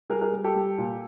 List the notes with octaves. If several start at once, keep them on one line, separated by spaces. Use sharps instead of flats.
G3 G#4 A#4
G#4 A#4
G3
G4 A4
G3
A#2